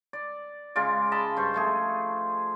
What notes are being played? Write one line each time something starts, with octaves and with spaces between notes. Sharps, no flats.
D5
C#3 G#3 F4 D5
D#5 A5 B5
G2 C5 C#6
F3 A3 G#4